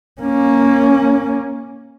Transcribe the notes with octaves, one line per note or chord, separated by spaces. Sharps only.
A#3 C#4